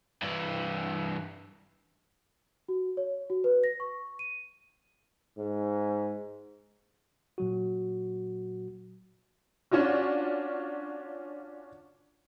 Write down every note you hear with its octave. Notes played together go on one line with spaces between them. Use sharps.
G2 E3
F#4
C#5
F#4
B4
A#6
C#6
D#7
G#2
A#2 F#3 F#4
C#4 D4 F4 F#4